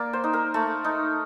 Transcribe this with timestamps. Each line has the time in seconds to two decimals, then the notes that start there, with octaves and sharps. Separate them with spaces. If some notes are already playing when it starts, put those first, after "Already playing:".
Already playing: A#3 D5
0.13 C5
0.24 D#4
0.33 A#4
0.54 A3
0.84 D#4